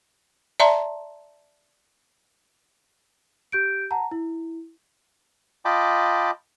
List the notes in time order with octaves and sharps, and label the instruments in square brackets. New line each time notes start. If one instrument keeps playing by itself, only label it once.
[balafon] D5 E5 A5 A#5 C6
[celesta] G4 G6 D7
F#5 A5 A#5
E4
[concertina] F4 D#5 G5 A5 B5 D6